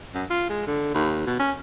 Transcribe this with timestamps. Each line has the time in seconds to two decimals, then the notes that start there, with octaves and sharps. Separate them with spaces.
0.14 F#2
0.30 F4
0.49 G#3
0.67 D3
0.94 D#2
1.26 B2
1.39 C#4